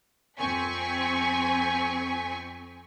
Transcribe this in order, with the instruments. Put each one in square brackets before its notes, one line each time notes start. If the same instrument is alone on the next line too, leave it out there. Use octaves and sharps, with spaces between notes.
[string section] F2 C4 G#5 C#6 B6